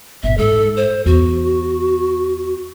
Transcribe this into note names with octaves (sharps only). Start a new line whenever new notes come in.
G1 A#2 E5
G#2 G#3 A4
C5
E2 F#4